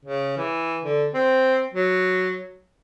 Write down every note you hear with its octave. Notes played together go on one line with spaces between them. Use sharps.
C#3
E3
D3
C4
F#3